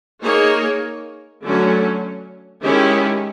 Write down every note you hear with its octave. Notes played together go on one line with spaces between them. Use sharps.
A#3 D#4 G#4 C#5
D3 F#3 A3 C#4
D#3 G#3 C#4 E4 G4